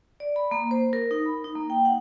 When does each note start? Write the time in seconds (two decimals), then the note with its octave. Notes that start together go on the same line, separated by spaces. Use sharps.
0.20 D5
0.36 B5
0.51 A#3
0.71 C5
0.93 A#4
1.11 D#4
1.26 B5
1.44 D#4
1.55 A#3
1.70 G5
1.85 F#5